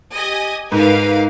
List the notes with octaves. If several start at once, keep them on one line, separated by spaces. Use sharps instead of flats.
G4 D#5 G#5
G#2 A#4 B4 F5